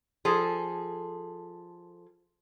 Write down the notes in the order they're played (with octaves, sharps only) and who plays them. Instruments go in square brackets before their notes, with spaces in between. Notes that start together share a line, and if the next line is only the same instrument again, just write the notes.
[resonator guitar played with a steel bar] F3 G#4 A4